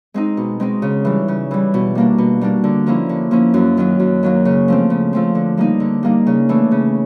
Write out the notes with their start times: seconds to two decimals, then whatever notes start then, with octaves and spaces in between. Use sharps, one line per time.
0.14 G#3 C4 D#4
0.37 B2
0.60 G#3 C4 D#4
0.82 C#3
1.05 E3 G3
1.28 C#3
1.51 E3 G3
1.74 B2
1.95 G3 A#3 D4
2.18 B2
2.41 G3 A#3 D4
2.64 D3
2.86 F3 A#3 C#4 E4
3.09 D3
3.31 F3 A#3 C#4 E4
3.54 F#2
3.77 D#3 F#3 A#3
4.00 F#2
4.23 D#3 F#3 A#3
4.45 C#3
4.68 F3 A3 C4
4.90 C#3
5.13 F3 A3 C4
5.35 D3
5.57 G3 A#3 D#4
5.80 D3
6.03 G3 A#3 D#4
6.27 C#3
6.49 E3 A3 D4
6.71 C#3